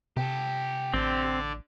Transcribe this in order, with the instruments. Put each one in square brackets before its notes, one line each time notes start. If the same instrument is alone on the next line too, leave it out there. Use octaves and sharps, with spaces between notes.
[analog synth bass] C3 [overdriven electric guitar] G4 A4
[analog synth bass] A1 [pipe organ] D3 D5 [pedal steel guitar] C4